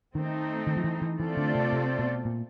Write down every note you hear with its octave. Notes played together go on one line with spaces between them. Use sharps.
D#3 A3 C4 D#4
D#3
F3
E3
E3
E3 A3 C4 F4 A4 D5
D3
C3
C3
B2
A#2